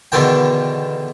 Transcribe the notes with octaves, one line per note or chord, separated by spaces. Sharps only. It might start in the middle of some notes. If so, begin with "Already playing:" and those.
E2 B2 D3 D#3 G5